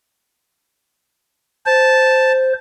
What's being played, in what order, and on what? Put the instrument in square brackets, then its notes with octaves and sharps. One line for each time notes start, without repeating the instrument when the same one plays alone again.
[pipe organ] C5 [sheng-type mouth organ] A5